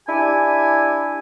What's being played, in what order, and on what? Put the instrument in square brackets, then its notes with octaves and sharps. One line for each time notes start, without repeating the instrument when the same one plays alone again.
[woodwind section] D4 E4 G4 G#5